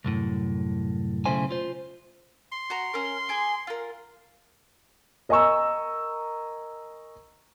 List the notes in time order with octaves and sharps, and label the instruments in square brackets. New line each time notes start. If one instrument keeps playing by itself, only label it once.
[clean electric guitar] C2 F#2 A2
B1 C#3 A3 E4 C5 G#5
F4 C5
[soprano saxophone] C6
[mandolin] F#4 A#5
C#4 A#4
G#4 G#5 D6
F4 A#4
[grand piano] A#4 D#5 G#5 A#5 C#6 E6